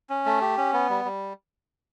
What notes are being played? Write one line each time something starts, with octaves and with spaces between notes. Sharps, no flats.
C#4
A3
G4
C#4
B3
G3
G3